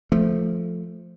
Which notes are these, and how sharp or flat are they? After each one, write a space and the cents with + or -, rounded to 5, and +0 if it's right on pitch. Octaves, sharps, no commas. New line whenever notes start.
F3 +0 A3 +0